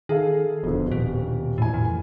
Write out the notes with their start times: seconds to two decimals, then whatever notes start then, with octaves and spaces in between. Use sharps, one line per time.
0.09 D#3 G#4 A4 F5
0.63 D#1 F2 B2 D3
0.91 D#1 B2
1.58 D#1 A2 E3 G#5
1.74 F2